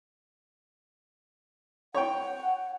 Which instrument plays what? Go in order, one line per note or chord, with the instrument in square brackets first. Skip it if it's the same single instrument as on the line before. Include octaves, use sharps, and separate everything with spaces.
[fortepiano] C#5 G5 [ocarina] F#5